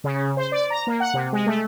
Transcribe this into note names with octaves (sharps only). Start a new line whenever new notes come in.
C#3
C5
D5
A#5
A#3
F#5
C3
G#3
A3